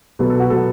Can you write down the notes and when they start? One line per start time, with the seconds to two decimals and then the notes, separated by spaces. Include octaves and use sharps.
0.19 B2 F#3 B3 A4
0.30 A4
0.40 F#4
0.50 B2 F#3 B3 A4